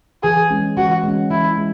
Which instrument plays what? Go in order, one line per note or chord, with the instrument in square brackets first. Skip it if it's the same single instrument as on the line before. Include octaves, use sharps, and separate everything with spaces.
[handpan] E3 [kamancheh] G#4
[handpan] G#3 C#4
[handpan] E3 [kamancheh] F#4
[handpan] G#3 C#4
[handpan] E3 [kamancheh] E4
[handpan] G#3